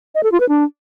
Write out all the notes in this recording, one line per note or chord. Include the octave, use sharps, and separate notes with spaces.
D#5
A4
F4
B4
D4